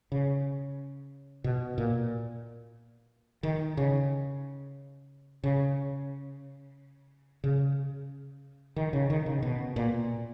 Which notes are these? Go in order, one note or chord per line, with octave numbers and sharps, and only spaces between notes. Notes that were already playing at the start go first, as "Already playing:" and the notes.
C#3
B2
A#2
D#3
C#3
C#3
C#3
D#3
C#3
D#3
C#3
B2
A#2